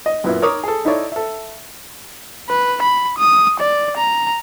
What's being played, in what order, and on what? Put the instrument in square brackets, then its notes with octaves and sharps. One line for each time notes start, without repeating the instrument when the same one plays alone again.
[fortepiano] D#5
F#2 A#2 B3 E4
A#4 C#5 A#5 D6 D#6
G#4 A4
D#4 E4 A4 C#5 D5
A4 E5
[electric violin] B4
B5
D#6
D5
A#5